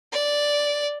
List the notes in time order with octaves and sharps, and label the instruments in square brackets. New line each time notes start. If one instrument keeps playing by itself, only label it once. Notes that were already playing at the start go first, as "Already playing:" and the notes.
[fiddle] D5